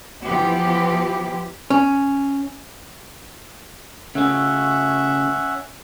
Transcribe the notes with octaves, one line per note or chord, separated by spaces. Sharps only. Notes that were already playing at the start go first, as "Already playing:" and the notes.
E3 F3 B3 G4
C#4
C#3 A3 C#4 E5 F#5